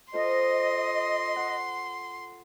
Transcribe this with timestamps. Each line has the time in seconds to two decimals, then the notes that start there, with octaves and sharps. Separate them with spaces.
0.13 F4 A4 C5 D#5 C6
1.36 F#5